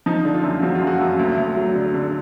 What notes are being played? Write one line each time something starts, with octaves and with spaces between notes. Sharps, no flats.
F3 D#4
D3
F4
F#2
F3 F#4
F4
F#2
F#4
F#2
D2
D2
F#3
D3
D3